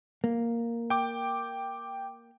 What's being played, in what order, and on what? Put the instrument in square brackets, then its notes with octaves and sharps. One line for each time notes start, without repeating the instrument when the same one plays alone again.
[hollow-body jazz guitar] A#3
[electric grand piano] G5 D6